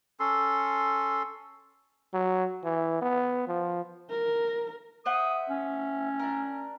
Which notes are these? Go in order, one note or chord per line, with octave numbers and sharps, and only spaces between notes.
C#4 A4 C6
F#3
E3
B3
F3
A#4
C5 E5 F#5 D#6
C#4
D4 A#4